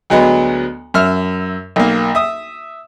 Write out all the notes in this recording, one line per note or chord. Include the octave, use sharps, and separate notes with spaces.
D2 F#3 G#3 B3
F#2 E5 F6
B1 A#3
E5 D#6